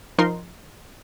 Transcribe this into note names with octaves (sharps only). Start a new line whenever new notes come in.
F3 D#4 A#4 C6